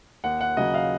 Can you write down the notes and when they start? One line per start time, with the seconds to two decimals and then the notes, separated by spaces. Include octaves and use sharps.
0.24 D#2 F#5
0.41 F#5
0.57 C#3 F#3 D#5
0.74 F5